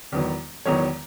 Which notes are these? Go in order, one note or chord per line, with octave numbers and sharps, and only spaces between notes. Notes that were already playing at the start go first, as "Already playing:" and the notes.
E1 E2 D#3 F#3 B3
E1 E2 D#3 F#3 B3 C#5